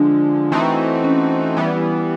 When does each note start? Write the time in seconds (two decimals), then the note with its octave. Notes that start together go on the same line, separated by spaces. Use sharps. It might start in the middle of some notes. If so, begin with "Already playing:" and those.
Already playing: D3 F3 G#3 D4
0.52 E3 A3 C4 D#4 F#4
1.04 C#4
1.57 E3 G3 B3